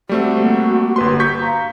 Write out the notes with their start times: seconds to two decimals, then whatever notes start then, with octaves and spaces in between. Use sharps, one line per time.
0.09 G3 A3 C4 F#4
0.37 A#3 G4 C5
0.96 G1 B4 C6
1.20 C#6 G6 B6
1.42 F5 A#5